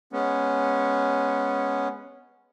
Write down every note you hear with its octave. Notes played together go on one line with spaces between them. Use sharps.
G#3 B3 C#4